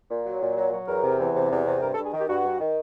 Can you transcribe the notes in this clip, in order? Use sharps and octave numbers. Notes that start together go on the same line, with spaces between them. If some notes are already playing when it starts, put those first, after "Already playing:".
A#2
F#3
A#2
F#3
F#3
E2 A#4
C3
E2
C3
E2
C3
G2 A#4
A4
G2
G#4
D#3 G4
G2 F#4
G2
D#3